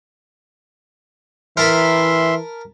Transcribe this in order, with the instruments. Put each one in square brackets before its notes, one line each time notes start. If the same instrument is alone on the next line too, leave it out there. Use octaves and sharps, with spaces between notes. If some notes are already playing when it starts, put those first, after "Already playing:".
[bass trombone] E3 [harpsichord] A#4 A5 B5 [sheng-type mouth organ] E5 C6